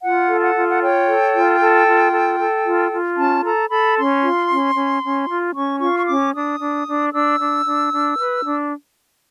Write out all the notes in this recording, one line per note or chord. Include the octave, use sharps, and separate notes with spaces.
F4 F#5
A4
F#5
F4
F#5
C#5 G5
A4
F4
A4
F4
A4
A4
F4
F4
C#4 A5
A4 A#5
A4 B5
C#4 C6
F4
C#4
C#4
C#4
F4
C#4 C#6
F4 C#6
C#6
C#4 D6
D4 D#6
D4
D4
D4 E6
D4
D4
D4
B4
D4